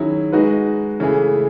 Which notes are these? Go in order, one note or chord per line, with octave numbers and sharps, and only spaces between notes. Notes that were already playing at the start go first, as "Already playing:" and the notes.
Already playing: D#3 F#3 C#4 E4 G#4
G#3 D#4 F#4 B4
C#3 E3 A3 E4 G#4